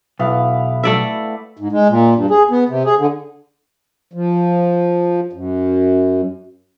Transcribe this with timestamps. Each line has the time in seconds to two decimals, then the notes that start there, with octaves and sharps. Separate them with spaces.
0.19 B1 B3 E4 F5
0.83 A3 D5 E5
1.57 G#2
1.72 G#3
1.89 A#2
2.15 G2
2.30 G#4
2.51 B3
2.69 C3
2.86 G#4
2.98 D3
4.13 F3
5.33 F#2